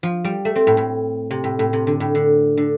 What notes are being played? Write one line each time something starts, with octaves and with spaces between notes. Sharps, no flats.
F3
G3
A3
C4
A2
A2
C3
A2
A2
C3
D3
A2
D3
D3